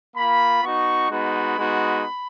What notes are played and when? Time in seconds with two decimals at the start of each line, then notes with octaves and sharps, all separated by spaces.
0.16 A#3 F4 B5
0.63 B3 D#4 F#4 C#6
1.10 G#3 B3 D#4 F#4 B5
1.57 G#3 B3 D#4 F#4